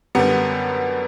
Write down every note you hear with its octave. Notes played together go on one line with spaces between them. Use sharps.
F#2 D3 G3 B3